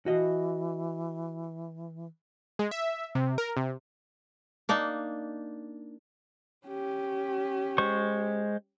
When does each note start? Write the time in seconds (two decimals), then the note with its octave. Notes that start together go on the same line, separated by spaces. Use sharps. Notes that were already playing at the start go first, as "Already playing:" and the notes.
0.06 E3 F#4 D#5
2.59 G#3
2.71 E5
3.15 C3
3.38 A#4
3.57 C3
4.69 A#3 D4 D#4
6.67 C#4 G4
7.78 G#3 C5 C#6